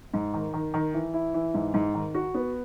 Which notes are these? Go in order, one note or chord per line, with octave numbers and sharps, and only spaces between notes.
G#2
D#3
D#3
D#3
E3
E4
E3
G#2
G#2
D#3
F#4
B3